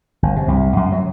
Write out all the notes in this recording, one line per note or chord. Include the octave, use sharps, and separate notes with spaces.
G1
C3
C2
F#2
F#3